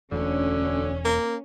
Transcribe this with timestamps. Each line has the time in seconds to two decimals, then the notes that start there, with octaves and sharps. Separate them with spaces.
0.12 E1 D2 D3 C#4
1.05 A#3